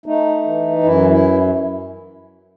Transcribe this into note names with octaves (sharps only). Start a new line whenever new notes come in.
A3 D#4
E3
F#2 E4
E4